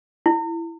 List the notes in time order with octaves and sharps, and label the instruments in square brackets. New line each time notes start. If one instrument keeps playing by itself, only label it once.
[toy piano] E4